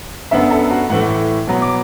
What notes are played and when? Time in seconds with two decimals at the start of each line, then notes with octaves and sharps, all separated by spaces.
0.31 F#2 D3 B3 E5
0.51 A4
0.71 F#4
0.90 A2 E3 A3 F#5
1.47 B2 F#3 B3
1.62 D6